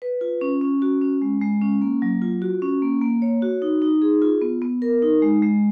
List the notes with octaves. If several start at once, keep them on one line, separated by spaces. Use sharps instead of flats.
B4
F4
C#4
C#4
F#4
C#4
G#3
G#3
C#4
A#3
F#3
F4
F#4
C#4
A#3
A#3
C#5
F#4
D#4
D#4
G#4
F4
B3
B3
A#4
D#4
G#3
G#3